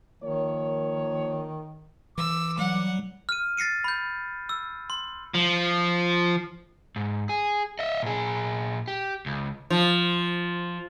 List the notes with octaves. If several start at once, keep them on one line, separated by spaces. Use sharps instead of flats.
D#3 F3 A#3 C#5
E3 D6 E6
F#3 G3 F#5
F6 D#7
A6 A#6 C7 C#7 D#7
B5 G6
E6
C6
F3
G#2
G#4
D#5 E5
A#2 G#4
G4
C#2
F3